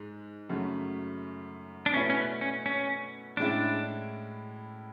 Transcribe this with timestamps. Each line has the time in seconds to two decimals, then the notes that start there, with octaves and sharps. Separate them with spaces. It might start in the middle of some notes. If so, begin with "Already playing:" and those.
Already playing: G#2 G#3
0.49 F#2 C#3 F#3 A3
1.86 D4
1.93 B2 A3 C#4 E4 B4 D5
2.10 C#4
2.17 B3
2.41 C#4
2.66 C#4
3.37 A2 G#3 C#4 D4 E4